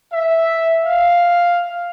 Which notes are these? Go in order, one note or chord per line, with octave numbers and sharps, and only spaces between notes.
E5
F5